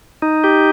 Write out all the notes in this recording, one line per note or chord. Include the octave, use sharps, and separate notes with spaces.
D#4
G4